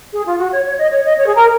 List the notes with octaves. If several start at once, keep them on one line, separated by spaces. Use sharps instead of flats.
G#4
F4
F#4
C#5
C#5
D#5
C#5
D#5
C#5
G#4
A#4